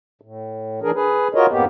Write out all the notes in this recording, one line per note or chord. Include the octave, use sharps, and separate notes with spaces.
A2
E3 D4 G#4 A#4
G#4 B4
F4 F#4 A#4 C#5 D#5
F2 G#2 A#3 B3 G4